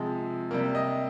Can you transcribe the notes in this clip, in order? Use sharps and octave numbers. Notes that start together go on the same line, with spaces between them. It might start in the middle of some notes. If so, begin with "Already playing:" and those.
Already playing: C3 F3 G#3
C3 G3 A#3
D#5